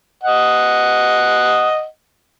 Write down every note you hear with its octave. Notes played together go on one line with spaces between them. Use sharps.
D#5 F#5